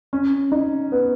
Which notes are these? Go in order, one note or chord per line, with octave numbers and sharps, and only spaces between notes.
C#4
D#4
B3